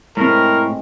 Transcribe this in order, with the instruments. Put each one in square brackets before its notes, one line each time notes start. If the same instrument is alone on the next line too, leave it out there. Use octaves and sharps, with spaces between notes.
[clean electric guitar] A2 [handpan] G#3 C4 [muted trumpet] A#4